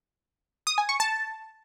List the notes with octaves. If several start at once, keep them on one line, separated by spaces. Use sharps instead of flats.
D#6
G#5
C#6
A5